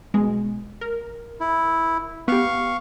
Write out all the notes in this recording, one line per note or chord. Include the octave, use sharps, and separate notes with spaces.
B2 G#3
A#4
E4
B3 G4 F5 C#6